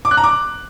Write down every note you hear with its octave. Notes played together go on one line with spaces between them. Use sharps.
D6
F#6
A#5
D6